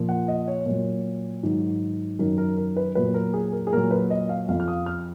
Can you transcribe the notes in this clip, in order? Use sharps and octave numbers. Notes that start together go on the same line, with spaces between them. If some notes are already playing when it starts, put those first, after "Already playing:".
Already playing: A#2 F3
F#5
D#5
C#5
A#2 F#3
G#2 D#3 F#3
F#2 D#3 F#3 A#4
A#4
A#4
B4
A#2 F#3 B4
A#4
G#4
A#4
G#4
A#2 F#3 A#4
B4
D#5
F5
F2 F3 F5
F6
D#6
F6